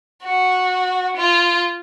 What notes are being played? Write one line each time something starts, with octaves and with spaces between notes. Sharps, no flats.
F#4
F4